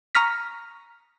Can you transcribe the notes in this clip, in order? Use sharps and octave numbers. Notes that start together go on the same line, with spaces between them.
A#5 C#6 D#6 F6 A#6 B6